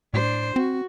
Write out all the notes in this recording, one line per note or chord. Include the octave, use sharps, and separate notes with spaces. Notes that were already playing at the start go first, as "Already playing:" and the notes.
A2 D4 C5
C4 F#4